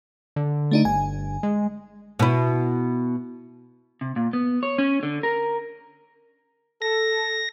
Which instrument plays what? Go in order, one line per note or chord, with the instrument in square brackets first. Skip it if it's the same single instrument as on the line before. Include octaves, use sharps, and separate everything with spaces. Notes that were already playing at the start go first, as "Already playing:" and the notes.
[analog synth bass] D3
[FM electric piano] A3 D4 D#4
[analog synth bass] G1 [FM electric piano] G#5
[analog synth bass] G#3
[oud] B2 E4
[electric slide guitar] C3
A#2
B3
C#5
C#4
D3
A#4
[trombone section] A4 [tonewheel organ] A#6